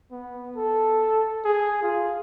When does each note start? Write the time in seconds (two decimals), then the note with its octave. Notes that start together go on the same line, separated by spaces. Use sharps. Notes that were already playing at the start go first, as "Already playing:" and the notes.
0.11 B3
0.56 A4
1.45 G#4
1.82 F4